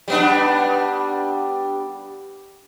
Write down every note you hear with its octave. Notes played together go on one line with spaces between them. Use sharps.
G3 B3 D4